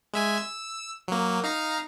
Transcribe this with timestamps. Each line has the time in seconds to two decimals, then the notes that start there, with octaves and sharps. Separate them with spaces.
0.14 G#3 E5 G#5
0.38 E6
1.08 F#3 A#3
1.44 D#4 F5 A#5